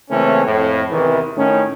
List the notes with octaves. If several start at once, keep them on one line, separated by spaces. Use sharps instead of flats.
C#3 E3 A3 A#3 C4 C#4
F2 A2
E2 C3 D#3 E3
A2 D#3 A3 C#4